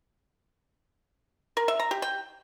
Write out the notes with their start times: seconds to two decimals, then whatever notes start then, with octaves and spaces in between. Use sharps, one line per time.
1.57 A#4
1.68 E5
1.80 A#5
1.91 G4
2.02 G5